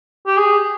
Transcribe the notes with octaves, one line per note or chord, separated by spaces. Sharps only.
G4
G#4